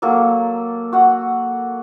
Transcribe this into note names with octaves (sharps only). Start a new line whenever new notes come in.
F#3 A#3 A4
F#4 F#5